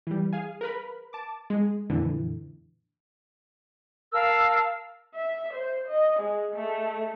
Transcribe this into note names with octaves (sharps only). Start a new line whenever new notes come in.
E3 G3
G#4 F5 G#5
A#4 B4 B5
A5 D6
G#3
F2 A#2 D3 E3
A#4 F5 A5 E6
E5
C5
D#5
G#3
A3